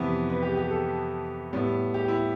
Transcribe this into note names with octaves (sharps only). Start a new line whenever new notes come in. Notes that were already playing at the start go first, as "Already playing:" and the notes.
Already playing: F2 C3 E3 B3 E5
B4
G4
G4
A4
A2 G3 B3
G4
E4